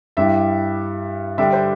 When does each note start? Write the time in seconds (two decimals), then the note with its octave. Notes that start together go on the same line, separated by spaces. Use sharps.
0.17 G2 G3 E4 G4 E5
1.38 D3 G3 D4 G4 E5
1.53 C5